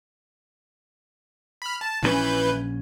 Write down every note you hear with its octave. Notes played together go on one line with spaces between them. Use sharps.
B5 F6
A5
A#1 D3 E3 C#4 B4 G6